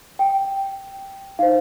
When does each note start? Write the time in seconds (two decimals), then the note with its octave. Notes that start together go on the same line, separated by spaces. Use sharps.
0.19 G5
1.39 D#4 C5 F5